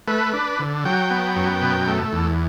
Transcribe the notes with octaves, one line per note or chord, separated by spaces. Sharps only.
A3 B4
D4
D3
F#3 G5
B3
F#2
B2
A3
E2